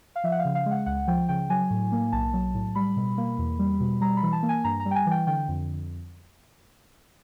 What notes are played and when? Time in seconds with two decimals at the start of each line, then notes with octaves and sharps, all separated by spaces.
0.16 F5
0.24 F3 E5
0.32 F#5
0.39 F5
0.45 C#3
0.55 F5
0.66 G#3
0.71 F#5
0.86 C#2 F#5
1.07 F3 G5
1.29 C#3 G5
1.50 F#3 G#5
1.71 A2
1.92 A#3
2.12 B1 A5
2.34 F#3
2.54 A2
2.75 G3 B5
2.97 B2
3.18 A#3
3.38 E2
3.59 G3
3.81 B2
4.01 G3 A#5
4.17 B5
4.22 E3
4.33 A5
4.43 A#3
4.49 G#5
4.64 G2 A#5
4.80 A#5
4.85 G3
4.91 G5
4.95 G#5
5.06 E3
5.11 G5
5.27 D3 G5
5.48 F2